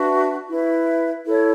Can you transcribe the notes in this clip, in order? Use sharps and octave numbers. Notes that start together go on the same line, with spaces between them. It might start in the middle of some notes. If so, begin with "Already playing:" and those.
Already playing: D4 F#4 B4 E5
E4 B4 E5
E4 A4 C#5